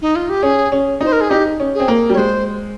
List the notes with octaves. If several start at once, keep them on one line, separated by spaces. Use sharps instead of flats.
D#4
F4
G4
C#4 G#4
C#4
D#4 C5
A#4
G#4
D#4 G4
C#4
G#4
C4
A#3
G3
C#5
G#3 C5